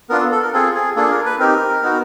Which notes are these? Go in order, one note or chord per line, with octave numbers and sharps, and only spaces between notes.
B3 D4 F4 A#4
A4
A4
A#4
C4 F4 G#4 A4
G#4
A#3 D4 F4 G#4 A4
A#4
B4
C4 D#4 G4 A#4
B3 D#4 F#4